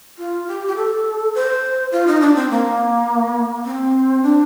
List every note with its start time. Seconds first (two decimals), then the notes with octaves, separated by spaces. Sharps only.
0.18 F4
0.48 G4
0.67 G4
0.76 A4
1.35 C5
1.92 F4
2.07 D#4
2.21 D4
2.36 C4
2.50 A#3
3.66 C4
4.23 D4